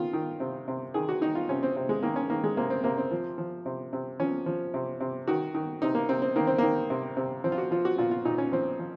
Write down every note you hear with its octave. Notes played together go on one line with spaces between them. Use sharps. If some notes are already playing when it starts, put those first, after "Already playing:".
Already playing: D#3 F4
D#3
C3
C3
D#3 G#4
F#4
D#3 D#4
F4
C3 C#4
C4
C3 C4
G#3
D#3 A#3
C#4
D#3 A#3
G#3
C3 A#3
C4
C3 A#3
C4
F3
F3
C3
C3
F3 C#4
F3
C3
C3
D#3 F#4
D#3
C3 D#4
A#3
C3 C4
C4
D#3 A#3
C4
D#3 A#3
C3
C3
F3 C4
F4
F#4
F3 F4
F#4
A#2 F4
F4
A#2 D#4
C#4
F3 C4
F3